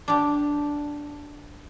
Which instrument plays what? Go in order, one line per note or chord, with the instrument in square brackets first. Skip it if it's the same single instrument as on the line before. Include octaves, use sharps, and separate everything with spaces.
[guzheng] D4 G4